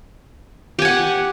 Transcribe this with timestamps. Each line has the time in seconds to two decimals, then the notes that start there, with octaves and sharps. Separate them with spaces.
0.79 G4
0.82 G#5
0.85 F#5